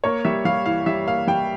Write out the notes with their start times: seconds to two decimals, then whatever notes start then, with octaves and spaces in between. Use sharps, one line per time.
0.04 A#3 C#5
0.25 G3 E5
0.45 G3 F5
0.66 E3 F5
0.86 G3 E5
1.06 A#3 F5
1.28 G3 G5